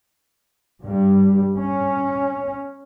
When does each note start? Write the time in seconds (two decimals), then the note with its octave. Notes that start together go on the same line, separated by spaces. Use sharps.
0.84 G2 G3
1.56 C#4